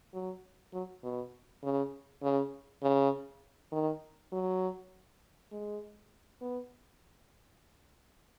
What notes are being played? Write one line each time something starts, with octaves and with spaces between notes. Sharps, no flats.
F#3
F#3
B2
C#3
C#3
C#3
D#3
F#3
G#3
B3